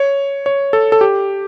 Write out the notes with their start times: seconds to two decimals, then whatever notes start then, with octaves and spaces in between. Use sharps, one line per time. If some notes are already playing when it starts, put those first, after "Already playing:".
Already playing: C#5
0.46 C#5
0.73 A4
0.92 A4
1.01 G4